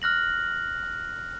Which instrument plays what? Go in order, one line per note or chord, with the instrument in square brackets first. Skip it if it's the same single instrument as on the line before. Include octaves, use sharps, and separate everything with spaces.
[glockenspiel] F6 F#6 A#6 F#7